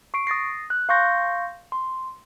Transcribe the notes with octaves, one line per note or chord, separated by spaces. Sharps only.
C#6 C7 D7
D#6 A6 A#6 C7
F#6
F5 C6 C#6 G6 A#6
C6